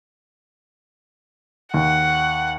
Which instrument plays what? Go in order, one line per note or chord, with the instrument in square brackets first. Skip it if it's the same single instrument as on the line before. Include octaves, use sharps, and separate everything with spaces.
[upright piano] D#2 [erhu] F#5